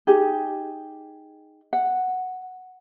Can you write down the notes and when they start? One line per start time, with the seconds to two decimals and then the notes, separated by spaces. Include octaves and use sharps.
0.07 D#4 G4 G#4
1.73 F#5